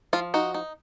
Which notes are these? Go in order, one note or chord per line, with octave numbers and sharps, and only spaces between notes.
F3 F4
D#4 F#4
D#4